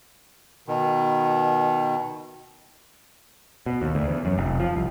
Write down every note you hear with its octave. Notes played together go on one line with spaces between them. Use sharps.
B2 D#3
B2
D#2
D2
E2
F#2
F1
F3
C2